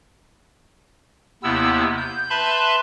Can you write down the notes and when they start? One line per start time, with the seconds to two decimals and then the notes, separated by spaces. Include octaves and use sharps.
1.43 D#2 C3 B3 E4 E6
1.98 G6
2.30 B4 E5 A5 B5 C6